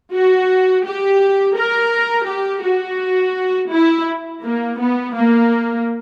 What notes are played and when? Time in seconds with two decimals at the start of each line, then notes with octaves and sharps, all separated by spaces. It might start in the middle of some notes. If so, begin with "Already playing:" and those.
0.13 F#4
0.85 G4
1.57 A#4
2.28 G4
2.64 F#4
3.72 E4
4.43 A#3
4.79 B3
5.15 A#3